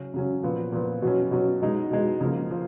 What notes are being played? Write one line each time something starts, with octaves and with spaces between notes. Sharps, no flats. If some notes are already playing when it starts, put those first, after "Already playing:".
Already playing: C#3 F#3 C#4
C#3 F#3 C#4
A#2 F3 B3
A#2 F3 B3
B2 F#3 C#4
B2 F#3 C#4
B2 G#3 D#4
B2 G#3 D#4
C#3 F3 A#3
F3 A#3